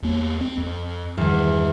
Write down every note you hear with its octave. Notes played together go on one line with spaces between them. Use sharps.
E2 A#3
C4
F2
E2 G2 D#3